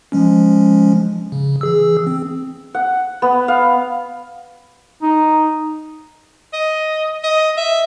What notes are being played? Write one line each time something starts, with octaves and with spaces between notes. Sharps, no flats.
F3 G#3 C#4
C#3
E3 G#4 E6
C4
F#5
B3
F5
D#4
D#5
D#5
E5